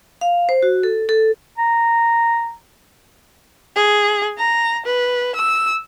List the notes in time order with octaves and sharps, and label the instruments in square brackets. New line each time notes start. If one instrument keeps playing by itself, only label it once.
[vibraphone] F5
C5
F#4
A4
A4
[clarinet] A#5
[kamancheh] G#4
A#5
B4
E6